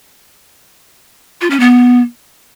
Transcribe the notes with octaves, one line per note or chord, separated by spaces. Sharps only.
F4
C#4
B3